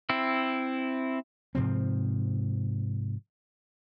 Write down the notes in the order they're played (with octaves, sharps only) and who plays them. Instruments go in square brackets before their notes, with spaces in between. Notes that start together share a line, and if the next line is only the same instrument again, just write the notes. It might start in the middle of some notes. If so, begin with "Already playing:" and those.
[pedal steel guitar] C4 E4
[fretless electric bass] G#2 C3 F3 C4